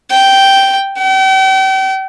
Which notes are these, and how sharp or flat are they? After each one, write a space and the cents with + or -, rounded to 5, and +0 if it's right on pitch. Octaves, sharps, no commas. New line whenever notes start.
G5 -5
G5 -40